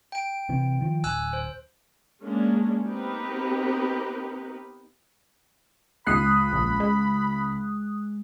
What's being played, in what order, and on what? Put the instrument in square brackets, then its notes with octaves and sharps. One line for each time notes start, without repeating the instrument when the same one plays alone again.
[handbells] G5 D7
[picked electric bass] C3 E3
D#3 F3
[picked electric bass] D1 [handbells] G#5 E6 F#6
[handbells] C5
[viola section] G#3 A#3 C#4 D4
B3 C4 D#4 G4 A#4 B4
[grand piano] C#2 C7 [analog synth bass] G#2 [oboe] B5 [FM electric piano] D#6 F#6
[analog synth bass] A#1
G#3